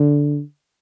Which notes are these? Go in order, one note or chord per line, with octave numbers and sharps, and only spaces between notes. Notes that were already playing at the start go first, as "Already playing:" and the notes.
Already playing: D3